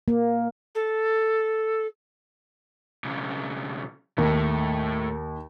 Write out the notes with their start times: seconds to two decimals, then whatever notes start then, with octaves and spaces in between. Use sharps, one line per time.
0.08 A#3
0.74 A4
3.04 B1 C#3
4.18 D#2 A2